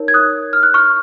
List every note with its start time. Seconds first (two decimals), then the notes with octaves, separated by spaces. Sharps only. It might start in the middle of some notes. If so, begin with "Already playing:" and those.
Already playing: D#4 A#4 C#5
0.08 G#6
0.14 D#6 F#6
0.53 F6
0.63 F#6
0.74 C#6 F6